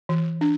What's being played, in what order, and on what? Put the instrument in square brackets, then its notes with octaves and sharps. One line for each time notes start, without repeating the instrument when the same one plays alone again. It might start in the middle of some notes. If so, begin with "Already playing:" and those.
[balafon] E3
D4